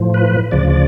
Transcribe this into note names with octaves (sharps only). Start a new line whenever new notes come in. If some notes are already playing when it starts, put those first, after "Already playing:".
Already playing: A2 F3
B4
D2 C#3 F3 D5
D5